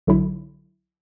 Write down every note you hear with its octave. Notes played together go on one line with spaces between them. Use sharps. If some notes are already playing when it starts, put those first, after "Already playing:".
B1 D3 F#3 E4